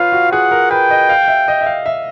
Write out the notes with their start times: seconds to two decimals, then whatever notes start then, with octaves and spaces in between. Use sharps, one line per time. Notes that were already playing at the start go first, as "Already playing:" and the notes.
Already playing: F4 B4 C#5 F5
0.12 F#4
0.32 G#4 F#5
0.51 A#4
0.71 B4 G5
0.91 D#5
1.09 F5
1.28 E5
1.48 D#5
1.61 E5
1.66 F5
1.86 E5